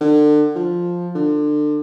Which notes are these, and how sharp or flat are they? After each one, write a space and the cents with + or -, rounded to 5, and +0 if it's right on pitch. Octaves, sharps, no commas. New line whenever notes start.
D3 +30
F3 +5
D3 +25